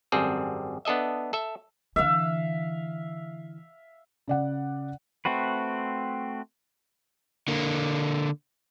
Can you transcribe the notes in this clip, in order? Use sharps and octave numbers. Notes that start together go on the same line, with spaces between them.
G#1 F#2 G3 C4 G#4 A4
B3 D4 A4 D#5 E5
A4 E5
D3 E3 E5 F5
C#3 D5 F#5
A3 C4 F#4 B4
D3 A#3